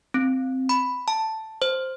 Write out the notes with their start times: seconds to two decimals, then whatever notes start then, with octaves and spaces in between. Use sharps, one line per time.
0.14 C4
0.69 B5
1.08 A5
1.62 C5